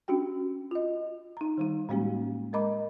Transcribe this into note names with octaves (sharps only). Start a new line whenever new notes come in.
C#4 D4 F#4 G4 G5
F4 D#5
D#4 A#5
D#3 G3 D#4
A2 G3 G#3 A#3 C#4 G4
G#3 A#4 D#5 A#5 B5 D6